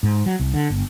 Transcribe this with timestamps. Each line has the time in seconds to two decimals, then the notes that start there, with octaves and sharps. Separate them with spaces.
0.03 G#2
0.26 F#3
0.39 C2
0.54 D3
0.70 G1